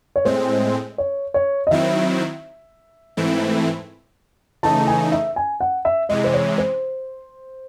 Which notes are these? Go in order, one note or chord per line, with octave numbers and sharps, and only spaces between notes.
C#5
A2 G#3 C4 C5
C#5
C#5
D#5
D#3 F#3 C4 E4 E5
G#2 E3 A3 C4 E4
C#3 E3 A3 D#4 A5
G#5
E5
G#5
F#5
E5
C3 E3 G#3 D#5
C5
C#5
C5